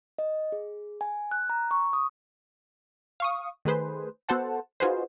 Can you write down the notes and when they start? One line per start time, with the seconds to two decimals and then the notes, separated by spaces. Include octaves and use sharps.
0.19 D#5
0.52 G#4
1.01 G#5
1.31 F#6
1.50 A#5
1.71 C#6
1.93 D#6
3.20 F5 C#6 D#6
3.65 D#3 A3 G#4 B4 C5
4.29 B3 F#4 A4 C5 F#5 A5
4.80 D#4 F4 F#4 G#4 B4 C5